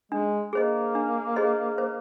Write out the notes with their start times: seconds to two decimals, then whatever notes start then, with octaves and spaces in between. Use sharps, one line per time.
0.12 G#3 D4
0.53 A#3 G#4 C5 D#5
0.95 D4
1.36 G#4 C5 D#5
1.78 C5